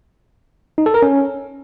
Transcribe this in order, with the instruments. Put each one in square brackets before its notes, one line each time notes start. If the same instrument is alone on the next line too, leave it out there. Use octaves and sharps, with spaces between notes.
[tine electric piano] D#4
A4
A#4
C#4